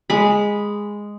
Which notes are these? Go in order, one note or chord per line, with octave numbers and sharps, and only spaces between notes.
G#3 B5